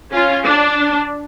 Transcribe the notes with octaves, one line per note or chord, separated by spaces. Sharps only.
C#4 F4
D4